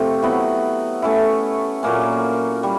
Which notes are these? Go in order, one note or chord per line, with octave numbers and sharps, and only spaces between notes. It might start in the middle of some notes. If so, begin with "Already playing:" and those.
Already playing: C3 F3 A3
F#3 B3 E4
A3 C#4 E4
A#2 F#3 A#3 C#4
G3